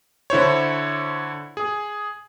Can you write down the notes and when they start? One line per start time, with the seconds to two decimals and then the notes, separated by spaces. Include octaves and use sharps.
0.30 D3 E4 C5 C#5
1.57 G#4